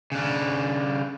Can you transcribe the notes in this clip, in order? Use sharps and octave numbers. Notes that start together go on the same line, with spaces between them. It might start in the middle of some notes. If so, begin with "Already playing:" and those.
C#3 D4